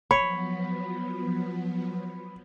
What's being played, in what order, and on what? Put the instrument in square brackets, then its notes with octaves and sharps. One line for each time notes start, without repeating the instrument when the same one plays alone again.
[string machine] F3 F#3 B3 [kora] C#5 [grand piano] B5